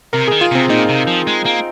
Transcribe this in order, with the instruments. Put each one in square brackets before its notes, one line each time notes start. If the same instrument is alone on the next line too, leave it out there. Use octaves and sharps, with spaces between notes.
[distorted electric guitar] C3 [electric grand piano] A#4
[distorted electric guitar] D#3 [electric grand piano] G#4
[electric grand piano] F4
[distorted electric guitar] C3 [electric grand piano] C4
[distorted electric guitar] A#2 [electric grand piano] D#4
[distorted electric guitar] C3
F3
G#3
A#3